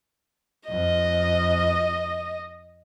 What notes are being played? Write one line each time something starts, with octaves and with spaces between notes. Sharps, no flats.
F2 D#5